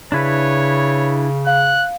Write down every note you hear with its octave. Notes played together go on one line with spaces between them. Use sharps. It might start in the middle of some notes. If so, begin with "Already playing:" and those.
C#3 D4 E4 B4 C#5
F5 F#6